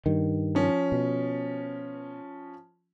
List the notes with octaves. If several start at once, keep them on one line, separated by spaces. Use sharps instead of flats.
G2 D#3
F3 C#4
B2